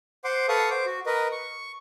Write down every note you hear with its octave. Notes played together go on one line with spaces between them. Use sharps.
C5 F#5 C6 D6
A4 B4 F5 F#5 C#6 D#6
C5 D6
F#4
A#4 B4 D#5
C#6